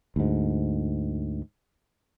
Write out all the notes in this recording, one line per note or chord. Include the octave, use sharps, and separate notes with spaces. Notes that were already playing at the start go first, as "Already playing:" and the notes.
D2 G#2